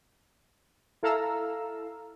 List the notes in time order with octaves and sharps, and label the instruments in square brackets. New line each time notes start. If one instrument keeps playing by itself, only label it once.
[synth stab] E4 A4 F5 A#5 E6